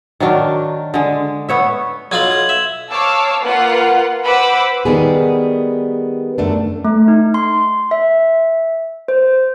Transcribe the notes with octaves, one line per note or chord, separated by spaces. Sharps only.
D#3 F#3 D4 A#4
D3 G#3
B3 C#5 E5
B1 D#4 F4 G#6 F#7
G#6
E5
C#5 F5 A5 D6 E6
A#3 F4 B4 F#5
B4 C5 F#5 B5 D6 E6
D#3 G3 B3 G#4
F#2 A3 D4
A3
D#4
C6
E5
C5